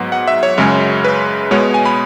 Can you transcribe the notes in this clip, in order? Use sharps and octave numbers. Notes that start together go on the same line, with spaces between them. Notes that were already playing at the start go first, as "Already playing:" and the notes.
Already playing: G#2 F#3 B3
F#5
E5
C#5
F#2 C#3 G#3 C#4
B4
B2 G#3 B3 C#5
G#5
B5